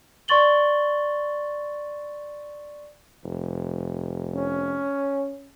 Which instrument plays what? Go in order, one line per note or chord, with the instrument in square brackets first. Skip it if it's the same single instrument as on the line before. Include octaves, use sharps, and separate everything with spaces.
[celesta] D5 C6 C#6 A6 F#7 G7
[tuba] F1
[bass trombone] C#4